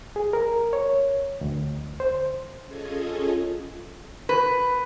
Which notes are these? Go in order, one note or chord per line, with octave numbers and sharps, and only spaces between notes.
G#4
A#4
C#5
D2
C5
C#4 F4 G#4 A4 D#5 G#5
B4